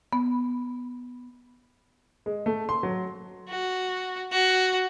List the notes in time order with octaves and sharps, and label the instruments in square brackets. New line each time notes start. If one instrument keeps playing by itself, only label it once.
[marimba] B3
[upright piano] G#3
A3
C6
F#3
[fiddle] F#4
F#4